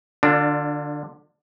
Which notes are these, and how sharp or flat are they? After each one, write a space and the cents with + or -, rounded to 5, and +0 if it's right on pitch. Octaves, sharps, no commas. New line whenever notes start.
D3 +25 D4 +0 F4 +45